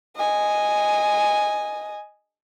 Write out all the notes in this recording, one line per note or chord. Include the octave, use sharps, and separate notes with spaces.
D#5 G#5